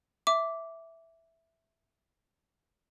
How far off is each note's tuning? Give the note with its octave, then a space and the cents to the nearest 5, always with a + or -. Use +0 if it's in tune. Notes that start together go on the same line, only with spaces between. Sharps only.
E5 +0 D6 -10